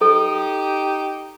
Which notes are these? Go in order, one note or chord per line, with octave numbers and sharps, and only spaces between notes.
D#4 G4 A4